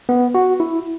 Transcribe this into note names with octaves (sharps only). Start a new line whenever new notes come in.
B3
F#4
E4